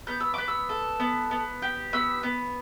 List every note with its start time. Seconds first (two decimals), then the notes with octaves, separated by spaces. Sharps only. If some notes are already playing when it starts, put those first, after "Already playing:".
0.07 B3 G6
0.20 E6
0.34 B3 D6
0.48 E6
0.69 A4
1.00 B3
1.31 B3
1.62 G4
1.93 B3 E6
2.23 B3